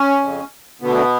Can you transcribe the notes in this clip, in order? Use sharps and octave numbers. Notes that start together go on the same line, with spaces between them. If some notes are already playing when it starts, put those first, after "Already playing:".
Already playing: C#4
F2 C#3
D2 B2 D3 B3